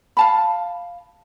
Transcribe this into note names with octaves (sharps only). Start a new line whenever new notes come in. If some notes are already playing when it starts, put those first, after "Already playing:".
F5 A5 B5